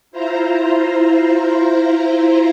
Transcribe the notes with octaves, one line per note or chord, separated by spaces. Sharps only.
E4 F4 C5 A#5